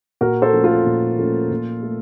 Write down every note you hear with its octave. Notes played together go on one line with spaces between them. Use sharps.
A#2 F#4 A#4
A4 C5
F3 A3 C#4
F4 A4
A#2
F3 A3 C#4
A#2
A3